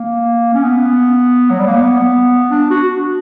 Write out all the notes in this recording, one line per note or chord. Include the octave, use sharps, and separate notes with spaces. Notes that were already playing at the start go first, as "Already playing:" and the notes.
Already playing: A#3
C#4
B3
F#3
G3
A#3
B3
D4
F#4